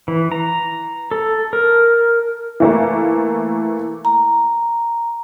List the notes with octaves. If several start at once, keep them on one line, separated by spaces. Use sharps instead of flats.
E3
A#5
A4
A#4
E3 A3 A#3
A#5